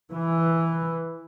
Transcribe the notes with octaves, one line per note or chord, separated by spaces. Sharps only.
E3